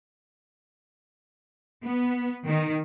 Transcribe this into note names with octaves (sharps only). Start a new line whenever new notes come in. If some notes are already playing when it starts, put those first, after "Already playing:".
B3
D#3